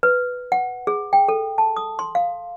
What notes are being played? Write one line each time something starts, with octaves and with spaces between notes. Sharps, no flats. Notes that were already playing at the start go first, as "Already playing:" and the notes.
B4
F#5
G#4
G5
A4
A5
D#6
C6
F5